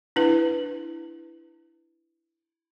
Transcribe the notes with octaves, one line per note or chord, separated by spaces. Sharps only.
D4 E4 B4